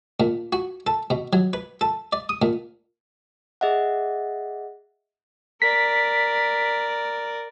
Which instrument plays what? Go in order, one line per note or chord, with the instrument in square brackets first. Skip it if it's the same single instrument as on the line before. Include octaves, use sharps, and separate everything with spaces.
[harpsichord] A#2
F#4
A4
B2
F#3
B4
A4
D5
D#6
A#2
[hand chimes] G#4 D#5 E5 F#5
[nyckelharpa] A#4 D5 [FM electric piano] B6